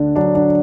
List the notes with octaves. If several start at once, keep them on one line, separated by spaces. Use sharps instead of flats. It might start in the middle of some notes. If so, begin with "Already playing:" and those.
Already playing: D2 D3 D4
F#3 D4
D4